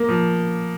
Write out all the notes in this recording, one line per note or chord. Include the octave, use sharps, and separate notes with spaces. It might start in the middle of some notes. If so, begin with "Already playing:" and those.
Already playing: A#3
F3